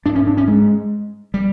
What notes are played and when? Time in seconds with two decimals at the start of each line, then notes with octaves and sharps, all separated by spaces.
0.05 G#2 D4
0.15 C#4
0.27 D4
0.37 C#4
0.48 G#3
1.34 G3